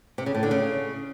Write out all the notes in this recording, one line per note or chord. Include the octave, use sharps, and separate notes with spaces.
C3
C#3
A2
D3
C#3